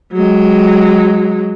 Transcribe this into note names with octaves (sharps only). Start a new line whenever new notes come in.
F#3 G#3